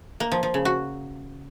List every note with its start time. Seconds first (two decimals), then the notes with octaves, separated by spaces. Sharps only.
0.20 A#3
0.32 F3
0.43 F3
0.54 C#3
0.65 F#4